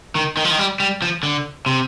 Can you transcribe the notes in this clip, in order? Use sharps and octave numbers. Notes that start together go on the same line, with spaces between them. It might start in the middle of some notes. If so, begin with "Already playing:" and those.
D#3
D#3
F3
D#3
G3
G3
F3
D3
C3